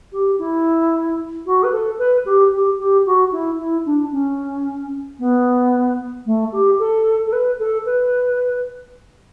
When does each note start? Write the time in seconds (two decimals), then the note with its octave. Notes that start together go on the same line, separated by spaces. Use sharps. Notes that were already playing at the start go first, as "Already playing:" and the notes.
0.12 G4
0.38 E4
1.46 F#4
1.63 B4
1.72 A4
1.98 B4
2.25 G4
2.52 G4
2.79 G4
3.06 F#4
3.32 E4
3.59 E4
3.86 D4
4.12 C#4
5.19 B3
6.26 A3
6.52 G4
6.79 A4
7.26 A4
7.32 B4
7.59 A4
7.85 B4